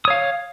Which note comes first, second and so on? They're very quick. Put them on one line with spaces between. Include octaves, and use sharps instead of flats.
D#6 C#5 F5